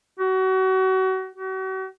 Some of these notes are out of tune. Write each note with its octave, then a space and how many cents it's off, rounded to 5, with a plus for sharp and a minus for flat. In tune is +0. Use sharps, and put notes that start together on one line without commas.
F#4 +30
F#4 +40